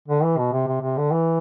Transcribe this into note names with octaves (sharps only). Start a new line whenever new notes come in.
D3
E3
B2
C3
C3
C3
D3
E3